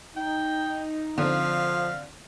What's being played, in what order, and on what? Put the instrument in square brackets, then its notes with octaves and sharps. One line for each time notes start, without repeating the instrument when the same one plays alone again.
[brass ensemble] D#4 [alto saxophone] G5
[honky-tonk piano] D3 C4 [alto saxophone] F3 [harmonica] F5